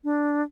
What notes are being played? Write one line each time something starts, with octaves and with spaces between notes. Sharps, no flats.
D4